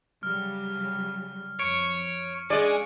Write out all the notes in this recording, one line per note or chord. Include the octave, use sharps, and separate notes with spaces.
C#3 F#3 G3 F6
F2 C#5 C#6 C#7 D7
G#3 C#4 D5 F5 G#5